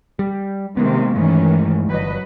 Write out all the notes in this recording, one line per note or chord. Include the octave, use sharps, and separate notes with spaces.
G3
C3 D#3 G#3 A#3 B3
G2 D#3 E3 G#3 A3 C#4
G1 F#3 B4 D#5